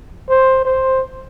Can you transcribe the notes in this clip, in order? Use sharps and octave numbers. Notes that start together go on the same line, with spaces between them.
C5
C5